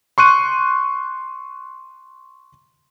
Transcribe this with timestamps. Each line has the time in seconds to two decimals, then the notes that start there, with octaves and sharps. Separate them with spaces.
0.18 C6 C#6 F#6 D#7